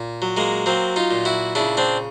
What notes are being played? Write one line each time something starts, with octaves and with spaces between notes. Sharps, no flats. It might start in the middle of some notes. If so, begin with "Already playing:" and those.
Already playing: A#2
F#3
G#3 A#3
F#3 A#3 C4
D#4 F4
A#2
E4 F#4
C#3 D4 E4
C4 D4